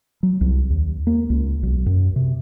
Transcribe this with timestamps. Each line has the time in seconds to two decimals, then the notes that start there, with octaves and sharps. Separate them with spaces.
0.23 F#3
0.41 C2
0.70 D#2
1.07 A#3
1.30 C#2
1.63 B1
1.86 F#2
2.16 C3